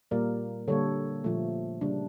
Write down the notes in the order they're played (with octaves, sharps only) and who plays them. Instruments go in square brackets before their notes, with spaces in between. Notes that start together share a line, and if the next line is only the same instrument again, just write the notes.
[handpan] A#2 G3 A#3 A#4 D5
D3 G3 A#3 A4 C#5
A#2 F3 A3
C#3 G3 A#3 D4